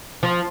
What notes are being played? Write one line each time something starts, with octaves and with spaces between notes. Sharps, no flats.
F3